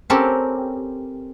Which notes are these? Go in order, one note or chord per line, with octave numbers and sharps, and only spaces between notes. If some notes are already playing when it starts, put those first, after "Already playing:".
C4 C#4 G4 A4 A#4